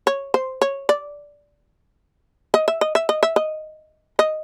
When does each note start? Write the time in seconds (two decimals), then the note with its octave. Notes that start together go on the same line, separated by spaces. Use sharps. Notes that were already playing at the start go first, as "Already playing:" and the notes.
0.07 C#5
0.34 C5
0.61 C#5
0.89 D5
2.54 D#5
2.68 E5
2.81 D#5
2.95 E5
3.09 D#5
3.23 E5
3.36 D#5
4.19 D#5